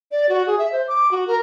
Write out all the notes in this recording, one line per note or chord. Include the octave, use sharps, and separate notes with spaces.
D5
F#4
G#4
E5
C5
D6
F#4
A#4